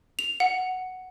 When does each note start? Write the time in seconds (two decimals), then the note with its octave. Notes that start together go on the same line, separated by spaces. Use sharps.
0.19 F7
0.40 F#5